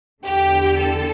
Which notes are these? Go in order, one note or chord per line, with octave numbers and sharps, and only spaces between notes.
E2 D3 G4
A4